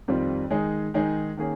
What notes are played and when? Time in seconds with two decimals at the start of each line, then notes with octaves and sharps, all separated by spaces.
0.08 F2 D#3 G3 C4 F4
0.51 D#3 G#3 D#4 G#4
0.94 D#3 G#3 D#4 G#4
1.37 D#3 A#3 C#4 G#4